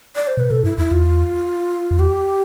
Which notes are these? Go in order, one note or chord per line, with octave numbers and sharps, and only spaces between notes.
D5
C5
B2 B4
B2 A4
G2 E4
E2 E4
E2 F4
F2
E2 G4